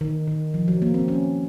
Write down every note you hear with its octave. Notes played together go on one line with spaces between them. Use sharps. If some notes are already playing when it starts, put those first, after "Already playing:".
D#3
D#3
F3
F#3
A#3
C4
C#4